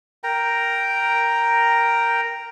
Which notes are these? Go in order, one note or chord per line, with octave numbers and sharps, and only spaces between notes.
A#4 G5 A#5